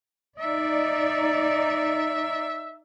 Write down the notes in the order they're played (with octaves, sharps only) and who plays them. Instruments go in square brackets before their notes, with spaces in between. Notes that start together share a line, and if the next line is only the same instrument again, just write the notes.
[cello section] D#4 D5 [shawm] E5